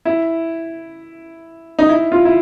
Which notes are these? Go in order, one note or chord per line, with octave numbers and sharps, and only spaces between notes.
E4
D#4
E4
F4
E4